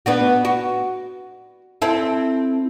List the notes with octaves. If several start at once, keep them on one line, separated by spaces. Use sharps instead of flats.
B3 D4 F#4
F#4
C4 E4 A4